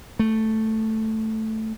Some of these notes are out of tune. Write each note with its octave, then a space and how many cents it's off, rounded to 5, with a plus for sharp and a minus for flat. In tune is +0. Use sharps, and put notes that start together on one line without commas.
A3 +0